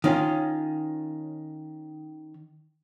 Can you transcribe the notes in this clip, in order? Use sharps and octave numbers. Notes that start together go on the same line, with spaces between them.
D#3 C#4 F4